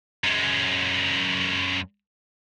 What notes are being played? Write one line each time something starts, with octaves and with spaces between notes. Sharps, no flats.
F#2 G#3